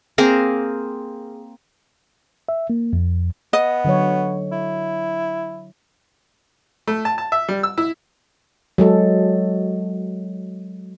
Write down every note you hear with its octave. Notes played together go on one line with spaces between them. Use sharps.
A#3 C4 G#4 A#4
E5
A#3
F2
B3 D#5
D3 F#3 C#5
E4
A3
A5
A5
E5
G3
E6
E4
F#3 G#3 A4